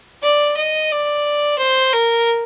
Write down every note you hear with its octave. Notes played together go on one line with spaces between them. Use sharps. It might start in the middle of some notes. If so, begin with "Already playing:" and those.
D5
D#5
D5
C5
A#4